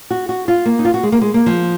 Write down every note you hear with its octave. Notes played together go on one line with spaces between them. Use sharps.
F#4
F#4
F4
A#3
D#4
F4
F#4
G#3
A#3
G#3
A#3
F3